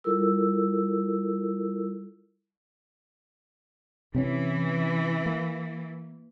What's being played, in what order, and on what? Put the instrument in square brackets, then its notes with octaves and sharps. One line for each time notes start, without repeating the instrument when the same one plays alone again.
[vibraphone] G3 E4 F4 A4 A#4 E6
[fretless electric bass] C3 C4 C#4 [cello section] E3
[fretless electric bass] A#3